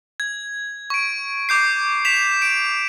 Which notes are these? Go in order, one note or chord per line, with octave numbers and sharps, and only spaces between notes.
G#6
C#6 D7
D6 G6 C7
B6 E7 F7
D7